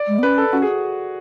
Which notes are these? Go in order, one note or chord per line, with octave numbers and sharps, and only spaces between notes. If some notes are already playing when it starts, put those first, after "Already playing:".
Already playing: D5
G#3
B3
C#4 B4
A4
C#4 F#4
G#4